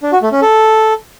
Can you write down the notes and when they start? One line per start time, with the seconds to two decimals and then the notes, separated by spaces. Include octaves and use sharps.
0.03 D4
0.12 F#4
0.22 A3
0.32 C#4
0.42 A4